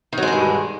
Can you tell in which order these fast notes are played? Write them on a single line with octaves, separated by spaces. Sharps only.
D#3 F#3 G#3 D3 G2